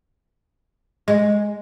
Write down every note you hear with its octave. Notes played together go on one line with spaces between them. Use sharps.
G#3